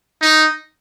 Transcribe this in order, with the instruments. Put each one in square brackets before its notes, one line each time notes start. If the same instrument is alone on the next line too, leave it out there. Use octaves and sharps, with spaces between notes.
[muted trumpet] D#4